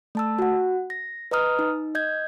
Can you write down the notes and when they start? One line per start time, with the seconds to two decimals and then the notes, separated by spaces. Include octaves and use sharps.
0.15 A3 A5 E6
0.39 F#4 F#5
0.90 A#6
1.31 B4 D#5 A#5 D#6 F6
1.59 D#4
1.95 D#5 G6 G#6